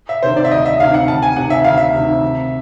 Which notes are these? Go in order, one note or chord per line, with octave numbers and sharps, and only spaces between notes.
E5
C3 D#3 C5
D5
E5
D2 D#5
E5
C3 D#3 F5
F#5
D2 A5
G#5
C3 D#3 F#5
E5
D2 F5
E5
C3 D#3
C3